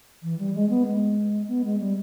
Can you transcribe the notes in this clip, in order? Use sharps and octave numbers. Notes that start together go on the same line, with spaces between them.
E3
G3
G#3
B3
G#3
B3
G#3
G3